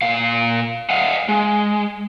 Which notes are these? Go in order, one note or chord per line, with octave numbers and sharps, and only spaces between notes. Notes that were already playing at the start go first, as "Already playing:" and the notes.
A#2 F5
D#5 F5 F#5
G#3